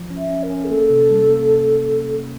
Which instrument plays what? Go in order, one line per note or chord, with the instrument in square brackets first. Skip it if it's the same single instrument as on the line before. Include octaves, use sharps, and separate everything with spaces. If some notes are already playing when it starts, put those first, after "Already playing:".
Already playing: [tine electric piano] F3
C#4
[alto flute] E5
[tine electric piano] C#4
[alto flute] A#4
[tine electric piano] C#4
[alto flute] G#4
[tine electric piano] A#3 [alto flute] A4
[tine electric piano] C3
G3
A#3